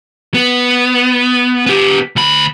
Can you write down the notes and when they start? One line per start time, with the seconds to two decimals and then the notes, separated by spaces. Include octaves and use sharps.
0.34 B3
1.66 B3 G4
2.16 D2 B5